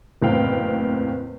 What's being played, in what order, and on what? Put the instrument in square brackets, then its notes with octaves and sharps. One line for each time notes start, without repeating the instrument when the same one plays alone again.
[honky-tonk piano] F#1 E2 A2 C4 F5 G5